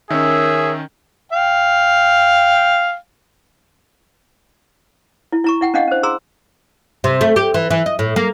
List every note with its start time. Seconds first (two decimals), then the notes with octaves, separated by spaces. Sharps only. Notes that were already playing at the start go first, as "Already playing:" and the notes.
0.10 D#3 C#4 G#4 A#4 C#5 E5 E6
1.32 F5 G5
5.32 E4
5.44 E4 A#5 C#6
5.61 E4 F#5 G5
5.74 C#4 D4 D#5 F5 F#5
5.87 C#4 C5
6.03 G#4 A#5 C6 E6
7.04 C3
7.21 A3
7.36 G4
7.54 E3
7.71 E3
7.86 D#5
7.99 A2
8.16 A#3